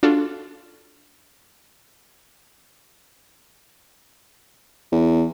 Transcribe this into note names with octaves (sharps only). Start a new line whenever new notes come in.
D4 F4 F#4 A4
E2